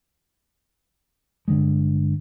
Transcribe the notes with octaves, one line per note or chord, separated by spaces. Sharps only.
G1 D3 G#3